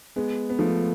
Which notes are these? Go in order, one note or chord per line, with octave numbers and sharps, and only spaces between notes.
G#3 B3
B3
F3 A3